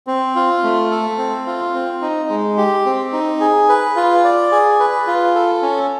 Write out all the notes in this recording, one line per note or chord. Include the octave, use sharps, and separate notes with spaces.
C4
F4
A3
A4
C4
F4
C4
D#4
G#3
G4
C4
D#4
G#4
B4
F4
D5
G#4
B4
F4
A4
C#4